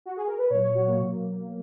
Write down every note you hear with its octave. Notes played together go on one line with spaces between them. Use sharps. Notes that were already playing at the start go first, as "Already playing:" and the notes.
F#4
G#4
A#4
B4
A#2 F#3 C#5
C#5
F#4
A#3
B2 F#3